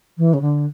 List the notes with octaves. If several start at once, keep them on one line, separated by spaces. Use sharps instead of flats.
E3
C#3
D3